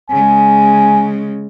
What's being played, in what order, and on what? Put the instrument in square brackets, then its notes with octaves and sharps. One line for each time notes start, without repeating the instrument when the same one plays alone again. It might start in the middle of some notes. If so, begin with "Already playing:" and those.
[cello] C#3 G#3 [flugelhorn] G#5